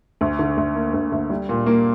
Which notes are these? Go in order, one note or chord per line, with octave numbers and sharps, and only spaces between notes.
D2
D3
D2
A#3
D2
D2
G3
A#2
A#3